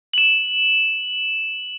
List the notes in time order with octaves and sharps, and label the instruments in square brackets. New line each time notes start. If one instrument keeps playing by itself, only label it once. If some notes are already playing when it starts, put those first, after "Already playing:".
[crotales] E7 F#7